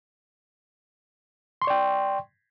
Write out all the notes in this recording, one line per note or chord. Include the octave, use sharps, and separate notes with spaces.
D5 G5 C6 C#6